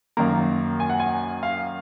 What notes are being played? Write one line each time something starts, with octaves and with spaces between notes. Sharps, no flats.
F#2 D#3 A#3 A#5
G#5
F#5
G#5
F5